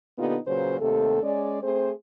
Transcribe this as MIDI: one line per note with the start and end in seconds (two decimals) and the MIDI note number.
0.18 0.36 46
0.18 0.36 50
0.18 0.36 59
0.18 0.36 63
0.18 0.36 65
0.18 0.36 67
0.47 0.79 46
0.47 0.79 49
0.47 0.79 54
0.47 0.79 71
0.47 0.79 72
0.80 1.22 39
0.80 1.22 48
0.80 1.22 57
0.80 1.22 69
1.22 1.62 56
1.22 1.62 61
1.22 1.62 68
1.22 1.62 74
1.62 1.91 57
1.62 1.91 60
1.62 1.91 68
1.62 1.91 72